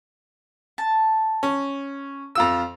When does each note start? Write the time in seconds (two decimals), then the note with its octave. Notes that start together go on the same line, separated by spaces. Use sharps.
0.78 A5
1.43 C#4
2.35 F2 F4 E6